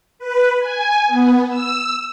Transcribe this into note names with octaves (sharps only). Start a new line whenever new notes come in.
B4
G#5
B3
E6